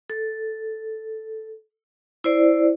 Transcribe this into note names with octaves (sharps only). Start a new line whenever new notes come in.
A4
E4 C5 D5